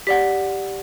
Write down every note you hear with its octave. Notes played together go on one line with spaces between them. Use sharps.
G4 D5 F#5 B6